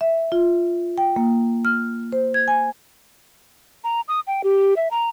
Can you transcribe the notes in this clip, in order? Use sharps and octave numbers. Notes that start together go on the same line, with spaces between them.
E5
F4
G5
A#3
F6
C5
G#6
G#5
A#5
D#6
G5
G4
E5
A#5